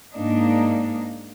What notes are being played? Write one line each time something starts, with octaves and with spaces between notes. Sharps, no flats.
G#2 A#3 D4 D#4